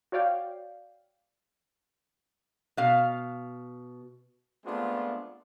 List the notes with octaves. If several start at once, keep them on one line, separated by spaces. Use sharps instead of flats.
F#4 C#5 D5 F5 G5
B2 F5
G#3 A3 B3 C4 D4 F4